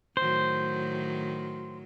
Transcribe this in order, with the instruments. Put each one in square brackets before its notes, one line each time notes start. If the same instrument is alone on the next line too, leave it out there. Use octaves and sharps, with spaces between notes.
[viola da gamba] A2 D#3 F#3 [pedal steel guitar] C5